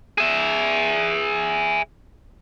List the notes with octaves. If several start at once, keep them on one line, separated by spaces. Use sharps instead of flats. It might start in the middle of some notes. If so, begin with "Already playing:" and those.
G#4 E5